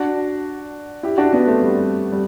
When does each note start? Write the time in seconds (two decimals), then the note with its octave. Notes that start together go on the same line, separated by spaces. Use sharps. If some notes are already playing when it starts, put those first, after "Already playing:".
Already playing: D4 F#4
1.03 E4 G4
1.18 D4 F#4
1.33 B3 D4
1.47 A3 C4
1.62 G3
2.12 G3